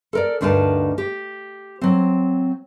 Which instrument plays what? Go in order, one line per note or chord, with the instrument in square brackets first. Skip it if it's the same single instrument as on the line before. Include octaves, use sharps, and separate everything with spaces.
[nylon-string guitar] A4 A#4 D5
D2 G2 D4 D#4 A#4 A5
G4
F#3 C4